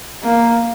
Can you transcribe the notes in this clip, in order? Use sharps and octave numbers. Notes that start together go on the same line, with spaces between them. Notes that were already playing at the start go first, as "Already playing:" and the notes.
A#3